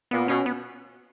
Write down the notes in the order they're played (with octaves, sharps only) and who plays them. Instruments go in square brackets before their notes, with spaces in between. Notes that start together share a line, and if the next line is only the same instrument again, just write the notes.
[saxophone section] A#2 [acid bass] B3
[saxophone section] B2 [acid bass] C#4
[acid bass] B3